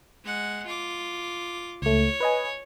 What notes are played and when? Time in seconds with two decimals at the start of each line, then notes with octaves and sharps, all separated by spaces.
0.24 G#3 F#5
0.66 F4 D6
1.82 C#2 A3 C#5
2.20 B4 D#5 G#5